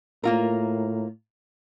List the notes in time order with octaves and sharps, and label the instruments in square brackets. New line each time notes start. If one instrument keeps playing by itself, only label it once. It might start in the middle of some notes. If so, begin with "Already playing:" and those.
[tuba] A2 [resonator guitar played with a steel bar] A#3 F4 A#4